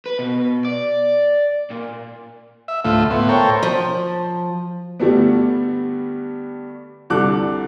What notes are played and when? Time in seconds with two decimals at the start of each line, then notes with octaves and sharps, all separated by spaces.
0.06 B4
0.19 B2
0.65 D5
1.71 A#2
2.68 E5
2.85 D2 A2 A3 F4 E5
3.10 A2 B3 C6
3.29 A4 A#4 C5 C#5 G5
3.63 F3
5.00 G2 D3 G3 A3 B3
7.10 C2 D3 A4 D6 F#6